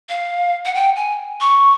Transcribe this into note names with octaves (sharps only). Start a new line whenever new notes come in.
F5
F#5
G5
G#5
C#6